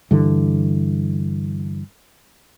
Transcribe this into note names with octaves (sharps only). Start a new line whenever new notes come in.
G2 D3 E3